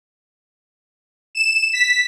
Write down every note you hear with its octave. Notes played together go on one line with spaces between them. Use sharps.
E7
B6